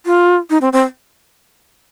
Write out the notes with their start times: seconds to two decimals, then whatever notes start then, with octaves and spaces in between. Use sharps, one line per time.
0.06 F4
0.50 D#4
0.61 C4
0.73 C4